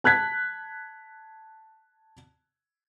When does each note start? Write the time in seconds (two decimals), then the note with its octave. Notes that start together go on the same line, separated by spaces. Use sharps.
0.04 A5 F#6 G#6 B6